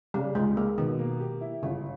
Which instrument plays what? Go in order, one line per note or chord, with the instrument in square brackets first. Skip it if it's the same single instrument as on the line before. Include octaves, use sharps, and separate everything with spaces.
[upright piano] C#3 [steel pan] G3
[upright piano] C#2 [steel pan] G#3
[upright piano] G#3 [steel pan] A#3
[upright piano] B2 [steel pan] D#3
[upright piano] A#3
G4
E4
[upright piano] G1 [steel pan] C#3